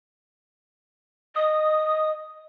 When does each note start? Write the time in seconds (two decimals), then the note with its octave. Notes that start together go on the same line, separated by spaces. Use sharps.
1.36 D#5 D#6